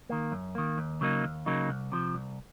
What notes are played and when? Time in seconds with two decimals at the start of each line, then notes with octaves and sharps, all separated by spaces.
0.09 D#3 A#3
0.32 F#2
0.55 D#3 A#3
0.78 D#2
1.01 C#3 F#3 A#3 D#4
1.23 D#2
1.46 C#3 F#3 A#3 D#4
1.69 C2
1.92 C3 F3
2.15 C2